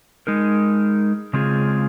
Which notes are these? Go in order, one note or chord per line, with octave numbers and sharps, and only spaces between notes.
G#3 D#4 A#4
C#3 G#3 C4 F4 G#4